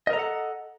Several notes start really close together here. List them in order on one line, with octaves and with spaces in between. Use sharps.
D#5 A#4 A#5 A4 F#5